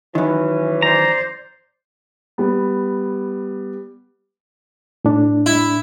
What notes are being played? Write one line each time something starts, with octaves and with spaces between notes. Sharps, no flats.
D#3 E3 F#3 C#4
C5 D5 A#5
G3 B3
A2 D4
E4